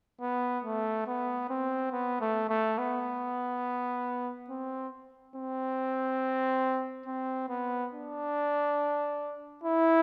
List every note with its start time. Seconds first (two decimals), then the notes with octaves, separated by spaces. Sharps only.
0.21 B3
0.64 A3
1.07 B3
1.49 C4
1.92 B3
2.21 A3
2.49 A3
2.78 B3
4.49 C4
5.36 C4
7.06 C4
7.49 B3
7.93 D4
9.64 E4